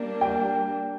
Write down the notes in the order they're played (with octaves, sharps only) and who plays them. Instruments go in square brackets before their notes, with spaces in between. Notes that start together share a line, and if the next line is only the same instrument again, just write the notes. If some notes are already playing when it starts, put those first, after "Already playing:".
Already playing: [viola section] G3 A#3 D4
[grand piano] G5